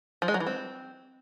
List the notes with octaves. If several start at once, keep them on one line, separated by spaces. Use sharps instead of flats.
F3
G#3
F#3
E3
C4